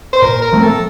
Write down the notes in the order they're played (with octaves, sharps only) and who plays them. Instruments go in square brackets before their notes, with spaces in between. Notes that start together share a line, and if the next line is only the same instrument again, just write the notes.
[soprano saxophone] C5
[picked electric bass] A#2 [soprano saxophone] A#4
[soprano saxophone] A#4
[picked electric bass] F3 A3 C4
[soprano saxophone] A4